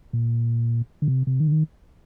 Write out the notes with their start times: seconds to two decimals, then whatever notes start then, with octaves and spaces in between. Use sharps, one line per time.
0.13 A#2
1.02 D3
1.08 C3
1.27 C3
1.40 D#3
1.47 D3
1.52 D#3